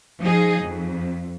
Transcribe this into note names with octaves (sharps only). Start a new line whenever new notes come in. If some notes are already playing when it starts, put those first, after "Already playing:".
F3 D#4 G#4
F2